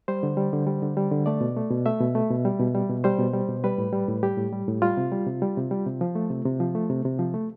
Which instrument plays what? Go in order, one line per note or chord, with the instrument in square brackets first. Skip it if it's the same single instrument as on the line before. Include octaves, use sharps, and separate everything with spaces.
[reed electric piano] G3 C5
D3
G3
D3
G3
D3
G3
D3
A3 D5
B2
A3
B2
A3 E5
B2
A3
B2
G3
B2
G3
B2
G3 C5
B2
G3
B2
G3 B4
A2
G3
A2
G3 G4
A2
G3
A2
G3 F4
C3
G3
C3
G3
C3
G3
C3
F3
A3
C3
C3
F3
A3
C3
C3
F3
A3